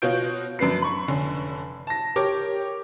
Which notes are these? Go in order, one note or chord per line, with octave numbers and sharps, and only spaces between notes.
B2 F4 F#4 C#5 G6 D7
F#2 D4 B4 C7
B5 C#6
F1 D3 C#4
A5 A#6
G4 A#4 C#5 D6